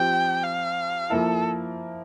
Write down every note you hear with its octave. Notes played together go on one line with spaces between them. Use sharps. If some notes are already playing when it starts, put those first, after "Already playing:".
Already playing: F3 C4 G4 G5
F5
F3 A#3 E4 A4